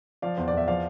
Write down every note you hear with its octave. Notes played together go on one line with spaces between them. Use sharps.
F3 D5 F5
E2 C5
D5
E2 E5
F3 D5 F5